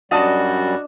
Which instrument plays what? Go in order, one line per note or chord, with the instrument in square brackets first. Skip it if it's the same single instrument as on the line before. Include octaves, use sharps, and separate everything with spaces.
[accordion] F#2 G3 [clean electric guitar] D4 D#5 [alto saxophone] F#4 [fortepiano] A5 D#6